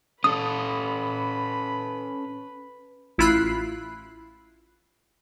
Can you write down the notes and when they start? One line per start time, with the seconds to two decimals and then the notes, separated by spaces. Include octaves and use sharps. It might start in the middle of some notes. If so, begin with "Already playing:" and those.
0.24 C#4 A4 B4 D#6
3.18 A1 E4 F4 B5 F#6 C7